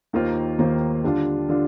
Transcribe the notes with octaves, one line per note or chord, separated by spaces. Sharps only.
D#2 D#3 A#3 F4 C5
D#2 D#3 A#3 F4 C5
D3 G3 D4 F4
D3 G3 D4 F4